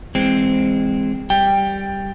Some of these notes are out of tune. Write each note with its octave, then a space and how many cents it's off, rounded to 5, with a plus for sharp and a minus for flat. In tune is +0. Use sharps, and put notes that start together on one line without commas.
E3 +0 G#3 -20 C4 +0
G3 +0 G5 +5